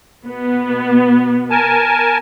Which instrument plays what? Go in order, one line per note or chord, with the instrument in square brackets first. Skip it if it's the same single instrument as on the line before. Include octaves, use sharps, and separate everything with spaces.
[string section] B2 B3
[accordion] A#4 G#5 A5